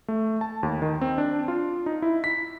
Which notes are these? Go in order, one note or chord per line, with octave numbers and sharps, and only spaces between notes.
A3
A5
D#2
D#3
C4
D4
F4
D#4
E4
B6